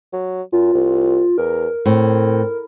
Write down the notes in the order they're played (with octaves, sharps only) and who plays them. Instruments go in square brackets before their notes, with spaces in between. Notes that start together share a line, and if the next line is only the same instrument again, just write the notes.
[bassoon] F#3
[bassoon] F#2 [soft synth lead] F4
[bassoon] C2
[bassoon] E2 [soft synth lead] A#4
[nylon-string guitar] A2 [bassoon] C4